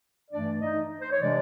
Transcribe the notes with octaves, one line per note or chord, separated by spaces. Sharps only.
G2 E3 A3 D4 D5
D#4 D#5
C5
C#5
C3 E3 G#3 D4 D5